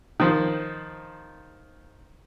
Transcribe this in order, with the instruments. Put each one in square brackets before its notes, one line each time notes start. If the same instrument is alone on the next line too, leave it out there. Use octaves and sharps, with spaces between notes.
[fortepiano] D#3 F3 C5